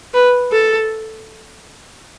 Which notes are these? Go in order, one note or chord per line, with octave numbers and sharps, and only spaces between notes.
B4
A4